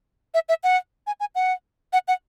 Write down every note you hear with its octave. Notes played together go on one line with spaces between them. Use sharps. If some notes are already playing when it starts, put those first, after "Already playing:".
E5
E5
F#5
G#5
G#5
F#5
F#5
F#5